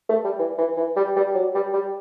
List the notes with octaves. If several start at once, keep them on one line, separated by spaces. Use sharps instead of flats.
A3
G3
E3
E3
E3
G3
G3
F#3
G3
G3